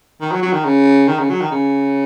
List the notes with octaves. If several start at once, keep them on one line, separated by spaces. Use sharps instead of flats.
D#3
F#3
F#3
D#3
C#3
D#3
C#3
F#3
D#3
C#3